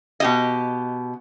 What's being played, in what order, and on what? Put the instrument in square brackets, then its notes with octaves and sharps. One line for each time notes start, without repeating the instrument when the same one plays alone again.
[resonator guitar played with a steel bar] B2 G4 D#5